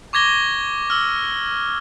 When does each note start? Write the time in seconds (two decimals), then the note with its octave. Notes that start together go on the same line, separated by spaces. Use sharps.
0.13 C#6 D6 G#6 A#6 G7
0.90 E6 F6